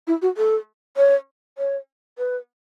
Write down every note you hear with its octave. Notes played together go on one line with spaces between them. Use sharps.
E4
F#4
A4
C#5
C#5
B4